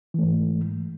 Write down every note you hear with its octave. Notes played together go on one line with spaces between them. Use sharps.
G#2 E3 A3